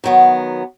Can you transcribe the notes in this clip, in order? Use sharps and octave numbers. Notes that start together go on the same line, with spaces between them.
D#3 F#3 B3